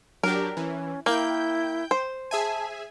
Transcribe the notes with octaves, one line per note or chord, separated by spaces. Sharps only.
F#3 D4 G4 A#4
E3 C#4
A#3 E4 G5 G6
C5
G#4 E5 G#5 A5